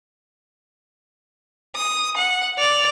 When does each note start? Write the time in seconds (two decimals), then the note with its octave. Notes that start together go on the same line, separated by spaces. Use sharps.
1.76 D#6
2.17 F#5
2.58 D5 F7